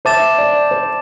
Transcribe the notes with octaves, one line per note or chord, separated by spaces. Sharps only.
C5 E5 A5 D6 A6 E7
D5
C5